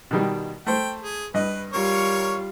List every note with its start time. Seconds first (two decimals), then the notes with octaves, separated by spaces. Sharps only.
0.11 B2 D#3 G3
0.66 A3 C5 G5
1.02 G#4
1.34 G2 B4 D#5
1.73 G3 F4 A#4 C#5 C#6